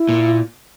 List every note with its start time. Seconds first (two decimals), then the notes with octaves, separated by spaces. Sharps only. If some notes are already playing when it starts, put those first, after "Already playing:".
Already playing: E4
0.09 A#2